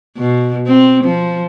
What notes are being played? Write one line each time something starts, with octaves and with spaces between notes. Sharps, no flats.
B2
C4
F3